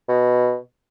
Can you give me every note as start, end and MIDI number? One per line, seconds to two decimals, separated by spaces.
0.09 0.56 47